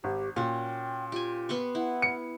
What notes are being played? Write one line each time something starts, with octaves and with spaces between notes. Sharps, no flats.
G#1 G4
A#2 C#4 F#4 G5
F4 G4 G#5
B3 C6 C#6
E4 F#5
C#7